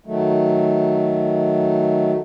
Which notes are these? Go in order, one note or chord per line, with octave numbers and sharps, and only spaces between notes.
D#3 F#3 A3